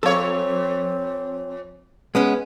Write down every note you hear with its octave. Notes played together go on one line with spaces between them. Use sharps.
F2 C4 A4 C#5 F5
G#3 B3 C#4